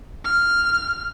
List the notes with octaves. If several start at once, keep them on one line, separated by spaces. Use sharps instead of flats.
F6